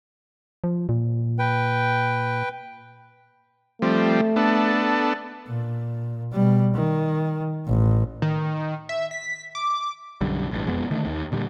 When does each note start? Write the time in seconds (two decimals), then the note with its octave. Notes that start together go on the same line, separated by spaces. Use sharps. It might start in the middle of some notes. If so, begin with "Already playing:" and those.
0.64 F3
0.89 A#2
1.39 B4 G5
3.82 F3 G3 A3 C4
4.36 B3 D4 A4
5.48 A#2
6.32 B2 G3
6.74 D#3
7.67 A1
8.22 D#3
8.89 E5
9.11 B6
9.55 D6
10.21 B1 F#2 D3 G3
10.51 A1 G2
10.67 E1 F2 G#3 B3
10.91 D3 D#3 A3
11.05 D#2 D#3
11.32 A#2 D3 G3